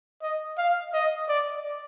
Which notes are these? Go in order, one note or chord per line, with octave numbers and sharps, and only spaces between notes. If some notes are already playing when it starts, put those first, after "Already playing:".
D#5
F5
D#5
D5